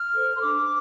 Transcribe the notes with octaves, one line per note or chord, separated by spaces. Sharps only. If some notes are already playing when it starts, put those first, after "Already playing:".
Already playing: F6
A4 C5
C6
D4 D6